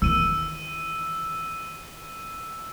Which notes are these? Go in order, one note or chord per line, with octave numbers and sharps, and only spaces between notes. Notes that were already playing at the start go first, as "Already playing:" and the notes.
D#3 E3 E6 D#7